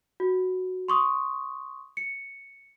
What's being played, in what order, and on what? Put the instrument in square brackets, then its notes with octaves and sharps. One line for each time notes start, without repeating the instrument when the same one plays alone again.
[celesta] F#4
C6 C#6 D#6
C#7